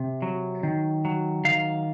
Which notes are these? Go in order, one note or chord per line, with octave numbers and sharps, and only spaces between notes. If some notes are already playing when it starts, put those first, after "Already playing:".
Already playing: C3
F#3
D#3
F#3
D#3 F5